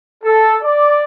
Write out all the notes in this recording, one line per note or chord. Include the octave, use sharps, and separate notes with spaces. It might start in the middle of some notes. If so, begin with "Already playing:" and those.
A4
D5